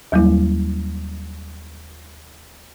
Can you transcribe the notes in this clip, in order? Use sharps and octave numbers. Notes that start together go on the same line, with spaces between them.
D#2 F#3 G3 A#3 E4